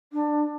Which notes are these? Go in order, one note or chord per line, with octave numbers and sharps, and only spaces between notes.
D4